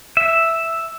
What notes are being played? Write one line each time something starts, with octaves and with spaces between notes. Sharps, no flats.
E5